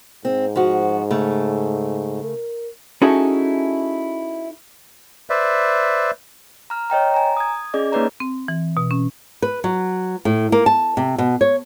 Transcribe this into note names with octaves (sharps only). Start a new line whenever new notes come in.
G#2 C4
F3 F#4
C#3 A3
A#4
C#4 D#4 E4 F#4 G#4 A4
B4 C5 D5 E5
A#5 F6
C#5 D#5 G5 A#5
G#5 A#5
D#6 G#6
C#4 G#4 D5 D#5
A#3 D#4 B4 C#5 D5 A#5
C4
E3
B2
C#4
B4
F#3
A2
A#3
A5
C3
B2
C#5